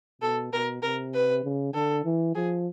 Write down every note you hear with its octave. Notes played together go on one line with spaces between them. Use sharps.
B2 A4
B2 A#4
C3 A#4
B4
C#3
D3 A4
E3
F3 G#4